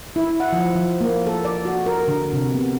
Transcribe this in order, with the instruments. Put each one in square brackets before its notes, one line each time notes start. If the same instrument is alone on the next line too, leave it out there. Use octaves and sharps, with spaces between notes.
[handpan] E4
F#5
F3
F3
A#3
A4
D5
F#4
A#4
D3
C3
B3